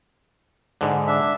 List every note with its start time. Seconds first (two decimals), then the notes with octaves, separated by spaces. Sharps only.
0.81 G#2 D3
1.07 D4 E5